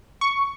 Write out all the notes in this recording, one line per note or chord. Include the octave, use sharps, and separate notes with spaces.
C#6